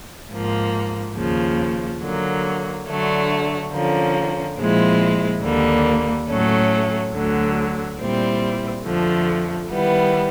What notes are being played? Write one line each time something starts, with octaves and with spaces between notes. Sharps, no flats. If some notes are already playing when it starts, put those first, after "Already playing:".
G#2 F3 A#3
D#2 C#3 F3
D3 F#3 A#3
D3 F#3 A3 D4
D3 F3 A#3 C#4
A#2 F3 G#3 C4 E4
D#2 D3 G3 A#3
A2 F#3 A3 C#4
D2 D3 F#3
A#2 G3 C4 E4
F2 D3 F3 A3
D#3 G3 B3 E4